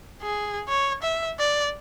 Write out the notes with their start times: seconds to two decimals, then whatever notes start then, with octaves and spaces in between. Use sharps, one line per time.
0.22 G#4
0.69 C#5
1.03 E5
1.39 D5